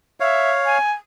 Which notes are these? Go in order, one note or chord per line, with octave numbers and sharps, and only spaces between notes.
C#5 E5 F5
G#5